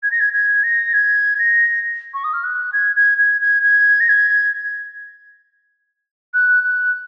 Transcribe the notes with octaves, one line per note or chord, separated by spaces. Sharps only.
G#6
A#6
G#6
G#6
A#6
G#6
A#6
C#6
D#6
F6
F#6
G#6
G#6
G#6
G#6
G#6
A#6
G#6
F#6
F#6